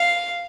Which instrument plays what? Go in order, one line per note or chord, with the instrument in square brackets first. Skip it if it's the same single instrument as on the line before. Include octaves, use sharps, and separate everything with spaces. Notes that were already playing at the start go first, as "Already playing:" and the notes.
Already playing: [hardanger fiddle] F5